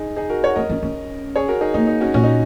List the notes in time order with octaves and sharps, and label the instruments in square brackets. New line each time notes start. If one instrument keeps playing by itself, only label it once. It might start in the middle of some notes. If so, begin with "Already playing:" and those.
Already playing: [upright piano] D#4 G#4
D#4 G#4
F#4 A#4
C#5 F#5
[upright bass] C#4 [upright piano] A#4 D#5
[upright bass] C#4
C#4
[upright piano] G#4 C#5
F#4 A#4
D#4 G#4
[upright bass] A#3 [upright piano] D#4
[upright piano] D#4
C#4 F#4
[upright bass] A#2 [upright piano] C#4 F#4
[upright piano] D#4